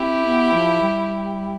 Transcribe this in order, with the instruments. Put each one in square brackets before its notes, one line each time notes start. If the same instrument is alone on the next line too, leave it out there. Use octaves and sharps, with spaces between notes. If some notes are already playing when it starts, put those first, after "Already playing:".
Already playing: [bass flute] C4 [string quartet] E4 G4
[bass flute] B3
F3
G3